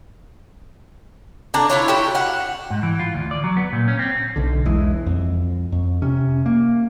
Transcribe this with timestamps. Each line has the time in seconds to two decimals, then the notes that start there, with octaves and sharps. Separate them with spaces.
1.54 D3 D4 A#5
1.70 E4 F4 C#5
1.88 F#4 G4
2.15 F5 F#5
2.70 G#2
2.83 E3
2.99 F4
3.14 D2
3.31 D5
3.44 F#3
3.57 B3
3.73 A#2
3.88 C#4
3.99 C4
4.36 B1 D3
4.65 E1 B1 E3 G#3
5.07 F2
5.72 F2
6.02 C3 C#4
6.46 A#3